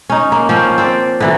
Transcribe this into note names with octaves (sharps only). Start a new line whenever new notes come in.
C#4 D#4
A#3
F3 C4 C#4
C4 D5
D3 E3 F#3